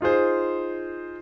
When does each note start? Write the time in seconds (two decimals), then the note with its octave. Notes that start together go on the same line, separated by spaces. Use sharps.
0.01 D#4 F4 G#4 C5